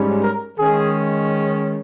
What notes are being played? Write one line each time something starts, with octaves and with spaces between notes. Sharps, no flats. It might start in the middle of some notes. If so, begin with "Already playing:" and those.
Already playing: G#2 G3 C#4
A#4
D#3 G#3 C#4 G#4